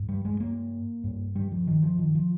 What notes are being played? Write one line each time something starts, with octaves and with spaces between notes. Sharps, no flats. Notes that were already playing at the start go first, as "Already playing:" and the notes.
Already playing: G2
G3
G#3
A#3
G2
G3
F3
D#3
F3
D#3
F3